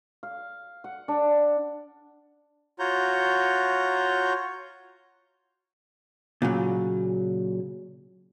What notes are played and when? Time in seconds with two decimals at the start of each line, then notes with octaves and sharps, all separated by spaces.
0.23 F5
0.84 F#5
1.08 D4
2.79 F4 F#4 C#5 A#5 G6
6.42 A#2 C#3 F#3